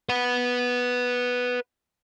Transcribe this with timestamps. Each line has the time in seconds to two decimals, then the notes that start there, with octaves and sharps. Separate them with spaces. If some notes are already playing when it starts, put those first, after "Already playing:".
0.09 B4 F#5